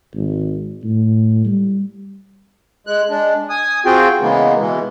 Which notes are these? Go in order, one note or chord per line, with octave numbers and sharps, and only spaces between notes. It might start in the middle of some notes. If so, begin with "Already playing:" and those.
G#1
A2
G3
G#3 F#6
G#3 D4
G#5 D#6
C4 F4 F#4 G#4 G5
C#3 E3 G#3 A#3 B3
B2 E3 G#3